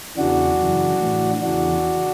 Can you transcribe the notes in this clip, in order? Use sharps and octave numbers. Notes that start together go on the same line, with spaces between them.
E2 C#3 E3 D4 F#4
F#2 C#3 E3
A2 E3
E2 C#3 E3 D4 F#4